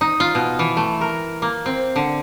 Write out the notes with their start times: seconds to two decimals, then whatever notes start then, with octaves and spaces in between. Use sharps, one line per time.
0.01 D#4
0.20 F4
0.35 B2
0.59 E3
0.77 A3
1.01 A#4
1.42 A#3
1.66 C4
1.96 D3